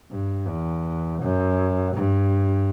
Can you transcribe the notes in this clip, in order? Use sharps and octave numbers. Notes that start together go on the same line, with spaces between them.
G2
E2
F#2
G2